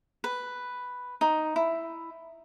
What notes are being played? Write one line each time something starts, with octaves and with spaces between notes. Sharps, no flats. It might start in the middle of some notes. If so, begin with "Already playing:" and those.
B4
D#4
E4